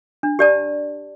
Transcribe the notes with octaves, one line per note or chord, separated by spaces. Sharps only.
D4
G4 D5 A5